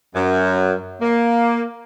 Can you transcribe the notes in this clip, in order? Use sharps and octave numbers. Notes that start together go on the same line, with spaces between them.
F#2
A#3